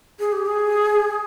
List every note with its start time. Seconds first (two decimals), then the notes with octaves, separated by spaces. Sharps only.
0.20 G#4
0.32 G4
0.46 G#4